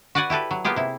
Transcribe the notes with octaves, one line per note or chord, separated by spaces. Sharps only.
F#4 B4 D5 F#5 G#5
E4 G4 A4 B4
F#3
A#3 B3 F4 G4 G#4
C3 E4